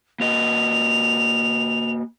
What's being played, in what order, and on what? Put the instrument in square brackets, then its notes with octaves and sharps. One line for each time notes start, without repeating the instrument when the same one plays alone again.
[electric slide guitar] A#3 F#4 D#5 [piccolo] F7